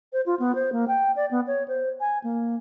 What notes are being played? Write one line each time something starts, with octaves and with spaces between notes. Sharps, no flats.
C5
F4
B3
C5
A#3
G5
D5
B3
C#5
C5
G#5
A#3